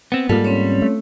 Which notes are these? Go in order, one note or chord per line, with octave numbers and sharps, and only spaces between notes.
B3 C4
G#2 G3 A#3 F4 A4
C4 C#4 C#5
A3